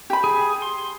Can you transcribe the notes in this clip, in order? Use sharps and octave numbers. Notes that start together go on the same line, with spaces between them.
G4 B5
G#4
C6